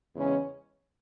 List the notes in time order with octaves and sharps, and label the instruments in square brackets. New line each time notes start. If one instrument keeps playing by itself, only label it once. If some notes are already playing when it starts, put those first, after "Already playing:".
[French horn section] E2 C#3 G#3 C#4